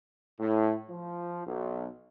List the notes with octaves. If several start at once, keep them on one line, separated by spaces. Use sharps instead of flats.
A2
F3
B1